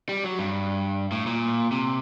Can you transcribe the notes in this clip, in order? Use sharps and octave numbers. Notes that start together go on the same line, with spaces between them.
G3
F#3
G2
A2
A#2
C3